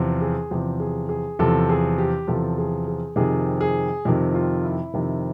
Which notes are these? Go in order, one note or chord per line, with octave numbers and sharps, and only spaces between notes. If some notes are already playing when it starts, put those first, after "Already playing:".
Already playing: E2 C3 F3
G#4
E2 C3 F3 G4
G#4
G#4
E2 C3 F3 A4
G#4
G4
E2 C3 F3 A4
G#4
G#4
F2 C3 D#3 G#4
G#4
F2 C3 D#3
F4
E4
F2 C3 D#3